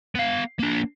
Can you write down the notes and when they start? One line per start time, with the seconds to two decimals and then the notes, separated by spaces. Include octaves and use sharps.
0.15 B3 F5
0.59 A#3 D4